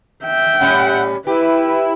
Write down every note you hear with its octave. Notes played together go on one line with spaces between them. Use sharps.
E5 G5
A2 G3 C#4 F#5
E4 G4 B4